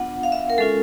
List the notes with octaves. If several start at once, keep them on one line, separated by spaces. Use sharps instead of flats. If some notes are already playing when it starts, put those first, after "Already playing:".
Already playing: B3 D4 F4 F#5
F5
E5
A#4
G#3 C#4 F4 A4